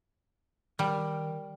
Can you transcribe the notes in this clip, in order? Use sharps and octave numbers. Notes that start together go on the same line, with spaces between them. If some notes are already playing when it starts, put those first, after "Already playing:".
D#3 G3 A#4